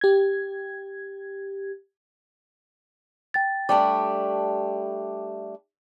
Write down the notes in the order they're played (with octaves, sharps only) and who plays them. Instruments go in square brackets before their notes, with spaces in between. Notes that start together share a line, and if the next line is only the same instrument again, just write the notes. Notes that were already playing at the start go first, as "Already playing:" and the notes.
[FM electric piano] G4 G#6
[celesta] G5 A6
[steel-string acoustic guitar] G3 A3 D4 [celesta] G5 D6